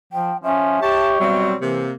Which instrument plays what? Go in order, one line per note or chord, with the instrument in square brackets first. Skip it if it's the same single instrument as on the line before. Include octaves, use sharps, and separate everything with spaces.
[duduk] F3 [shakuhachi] G5
[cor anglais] F3 [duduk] C#4 [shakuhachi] E5
[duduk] G4 [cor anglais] C#5 [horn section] A5
[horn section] B2 F#3 C4 [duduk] G3
[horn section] C3 A#3 [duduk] E3